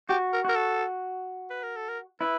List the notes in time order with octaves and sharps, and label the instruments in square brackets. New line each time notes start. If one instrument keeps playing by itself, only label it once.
[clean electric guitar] F#4 [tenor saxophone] G4
[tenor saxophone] A#4
[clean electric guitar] F#4 [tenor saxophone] A#4
[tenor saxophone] A4
B4
A#4
A4
A#4
[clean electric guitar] E4 [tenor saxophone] B4